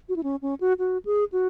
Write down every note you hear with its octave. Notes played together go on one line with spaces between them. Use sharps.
F#4
E4
C#4
C#4
F#4
F#4
G#4
F#4